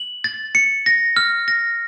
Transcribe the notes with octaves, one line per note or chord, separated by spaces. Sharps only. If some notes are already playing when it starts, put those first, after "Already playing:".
Already playing: F#7
A6
C#7
A#6
F6
A#6